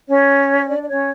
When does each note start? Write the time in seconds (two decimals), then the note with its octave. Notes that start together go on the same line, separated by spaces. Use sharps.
0.08 C#4 C#5
0.64 C#5
0.68 D4 D5
0.83 D5
0.89 C#4 C#5